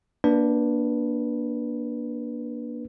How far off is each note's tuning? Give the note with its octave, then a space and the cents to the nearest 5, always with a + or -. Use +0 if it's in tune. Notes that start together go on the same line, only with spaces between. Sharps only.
A#3 +25 D4 +0 B4 -15